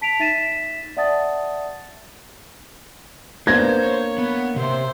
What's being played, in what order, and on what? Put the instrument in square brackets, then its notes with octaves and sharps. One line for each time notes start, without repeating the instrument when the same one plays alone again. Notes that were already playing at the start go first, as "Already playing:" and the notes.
[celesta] A5 B6 D7 F7
D#4 E5 A6 B6 D#7 E7
D5 E5 F#5 A5 D#6 A6
[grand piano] A#3 D4 A#6 [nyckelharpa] B3 [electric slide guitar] C5 [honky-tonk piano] G#6
[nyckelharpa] C#5
[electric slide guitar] B3
[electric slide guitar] C3 [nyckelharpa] C5 E5